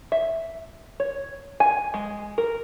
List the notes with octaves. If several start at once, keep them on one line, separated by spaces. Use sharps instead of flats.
E5
C#5
G#5
G#3
A#4